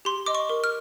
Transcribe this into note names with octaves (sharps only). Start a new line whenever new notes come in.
G4 C6
D#5 D6
C#6
A#4
F6